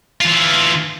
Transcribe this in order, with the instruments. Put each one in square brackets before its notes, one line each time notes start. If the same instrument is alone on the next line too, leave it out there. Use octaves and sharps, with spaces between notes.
[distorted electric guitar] E3 F4